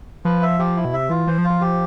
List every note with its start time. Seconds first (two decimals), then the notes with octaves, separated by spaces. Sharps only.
0.25 F3 B4
0.42 E5
0.59 F3 G4
0.76 E4
0.85 B2
0.93 C3 E5
1.10 E3 F4
1.27 E3 C5
1.38 F3
1.44 F4
1.50 F3
1.61 F3 G4